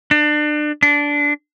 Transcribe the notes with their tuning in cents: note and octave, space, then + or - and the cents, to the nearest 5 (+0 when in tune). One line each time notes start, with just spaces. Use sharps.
D4 +30
D4 -15